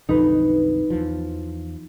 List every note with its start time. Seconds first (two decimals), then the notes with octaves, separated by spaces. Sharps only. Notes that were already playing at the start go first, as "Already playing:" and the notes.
0.09 B1 F2 D3 D#4 B4
0.90 E2 E3 F3